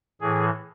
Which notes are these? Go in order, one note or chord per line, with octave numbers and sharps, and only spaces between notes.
A2 E3 G#4